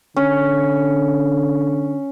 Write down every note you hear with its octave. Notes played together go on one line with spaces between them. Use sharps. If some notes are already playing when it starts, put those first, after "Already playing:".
D3 C#4